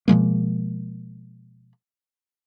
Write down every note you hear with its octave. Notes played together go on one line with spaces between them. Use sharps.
B2 F3 G#3 A#3